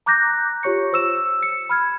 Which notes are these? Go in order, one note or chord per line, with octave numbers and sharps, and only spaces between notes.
A#5 D6 F#6 G6 A#6
F4 G4 C#5 C#6 C#7
C5 E6 E7
C#7
B5 F6 G#6